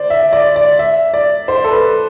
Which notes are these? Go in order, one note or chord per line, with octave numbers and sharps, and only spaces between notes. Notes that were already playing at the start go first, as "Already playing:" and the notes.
Already playing: C5 D5
E5
D5
D5
E5
D5
C5
A4
B4